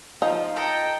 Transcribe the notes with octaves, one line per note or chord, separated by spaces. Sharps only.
F3 D#4 F5
A4 D#5 G5 A#5